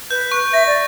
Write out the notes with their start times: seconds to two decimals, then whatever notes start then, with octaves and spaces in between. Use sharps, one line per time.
0.11 B4 G6
0.32 C#6
0.53 E5 A#6
0.67 D5